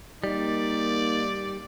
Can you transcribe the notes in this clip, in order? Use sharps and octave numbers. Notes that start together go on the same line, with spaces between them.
G3 A#3 D#4 D5